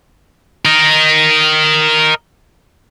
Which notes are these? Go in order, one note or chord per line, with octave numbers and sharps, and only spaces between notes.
A#4 D#5